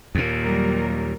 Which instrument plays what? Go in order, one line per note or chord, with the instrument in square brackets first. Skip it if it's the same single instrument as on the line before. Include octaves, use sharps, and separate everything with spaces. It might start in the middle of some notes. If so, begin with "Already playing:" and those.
[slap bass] D#2 A#2
[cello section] F#3 G3 A#4